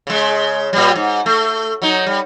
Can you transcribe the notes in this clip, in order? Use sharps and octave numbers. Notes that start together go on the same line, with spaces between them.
C#3 G#3
A#2 G3
G#2
A3
F#3 D#4
G3